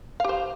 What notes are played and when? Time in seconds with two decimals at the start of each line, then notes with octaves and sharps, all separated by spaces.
0.20 F5
0.24 G4
0.29 C5